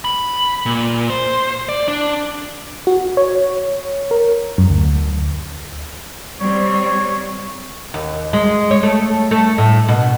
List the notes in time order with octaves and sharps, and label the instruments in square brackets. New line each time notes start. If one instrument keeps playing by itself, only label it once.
[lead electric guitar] B5
A#2
C5
D5
D4
[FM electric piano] F#4
C#5
A#4
F#2
D2
[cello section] G3 C4 [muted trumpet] C#5
[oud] D#2
G#3
C#5
A3
A3
A2
B2